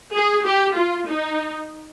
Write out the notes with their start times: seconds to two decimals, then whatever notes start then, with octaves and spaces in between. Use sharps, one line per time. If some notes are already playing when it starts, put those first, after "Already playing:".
0.14 G#4
0.45 G4
0.75 F4
1.07 D#4